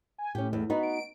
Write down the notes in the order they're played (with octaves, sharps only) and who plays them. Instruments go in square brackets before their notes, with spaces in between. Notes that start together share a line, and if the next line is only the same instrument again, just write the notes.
[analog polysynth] G#5
[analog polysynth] A2 [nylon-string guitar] C#4 G4
[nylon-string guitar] E2
[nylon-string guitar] B3 D#4 F#4 [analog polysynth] B5
[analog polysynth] D7